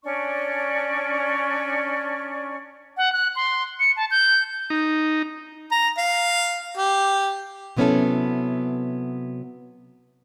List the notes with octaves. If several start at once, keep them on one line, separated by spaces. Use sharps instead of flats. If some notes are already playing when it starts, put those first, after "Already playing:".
C#4 D4 D5 C#6
F#5
F#6
C6
C#7
A5
G6
D#4
A#5
F5
G4
C3 F#3 B3 C#4 E4 A4